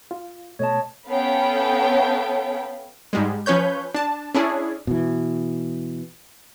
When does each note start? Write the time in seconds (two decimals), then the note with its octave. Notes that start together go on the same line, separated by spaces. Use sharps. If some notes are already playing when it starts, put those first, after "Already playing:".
0.11 F4
0.59 B2 A3 C#5 D#5 A5
1.09 B3 C#4 A4 F5 G5 B5
3.13 G#2 G3 G#3
3.46 F3 C#4 B4 C#5 G6
3.95 D4 A5
4.35 C#4 D4 E4 G#4
4.87 B2 E3